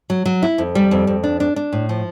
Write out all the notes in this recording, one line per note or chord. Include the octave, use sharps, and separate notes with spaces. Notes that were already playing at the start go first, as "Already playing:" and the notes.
F#3
F#3
E4
F2
G3
F2
F2
D4
D4
D4
A2
F3